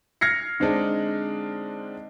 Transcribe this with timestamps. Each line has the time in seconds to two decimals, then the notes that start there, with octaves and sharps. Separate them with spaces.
0.21 F6 G#6 A#6 C7 C#7
0.60 D3 G#3 C4 D4 D#4